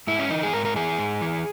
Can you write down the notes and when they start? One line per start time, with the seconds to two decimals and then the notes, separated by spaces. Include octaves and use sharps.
0.07 G#2 E4
0.19 C#4
0.30 E3 D#4
0.43 G#4
0.53 G#2 A#4
0.65 A#4
0.76 E3 G#4
0.99 G#2
1.21 E3